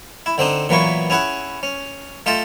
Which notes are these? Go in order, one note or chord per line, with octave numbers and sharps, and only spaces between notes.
E4
D3 C4 D4 D#4
A#2 E3 F#3 A#3 B3 C#6
C#4 E4 G#4 F#5
C#4
A3 F4 D#5 G5 A5